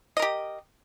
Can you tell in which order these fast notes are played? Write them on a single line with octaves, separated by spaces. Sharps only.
D#5 A#4 G4